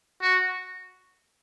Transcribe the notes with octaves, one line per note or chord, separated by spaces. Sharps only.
F#4